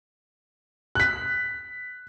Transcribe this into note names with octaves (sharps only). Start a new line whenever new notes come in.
F#6 B6